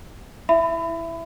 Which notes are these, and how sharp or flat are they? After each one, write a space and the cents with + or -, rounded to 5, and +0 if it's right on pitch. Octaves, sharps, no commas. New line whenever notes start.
E4 -5 E5 +15 B5 +25